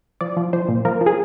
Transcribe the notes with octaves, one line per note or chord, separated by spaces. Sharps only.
F3 D5
F3
F3 C5
A#2
F3 A#4
F3
G#4